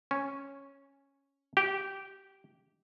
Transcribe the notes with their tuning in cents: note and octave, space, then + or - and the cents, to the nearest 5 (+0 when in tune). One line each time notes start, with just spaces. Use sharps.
C#4 -5
G4 -15